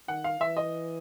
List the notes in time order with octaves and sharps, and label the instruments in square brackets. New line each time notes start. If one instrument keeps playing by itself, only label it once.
[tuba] D#3 [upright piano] F#5
[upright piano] F5
[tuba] E3 [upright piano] E5
[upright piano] D#5